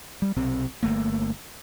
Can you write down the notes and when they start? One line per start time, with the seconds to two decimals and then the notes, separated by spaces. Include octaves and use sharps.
0.22 G3
0.36 B1 C3 C4
0.83 G1 A3 A#3